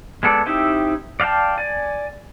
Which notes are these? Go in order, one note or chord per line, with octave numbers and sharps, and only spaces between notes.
G#3 B3 A4 D5
C4 D#4 E4 G4 E5
D5 F5 G5 A5
D5 G#5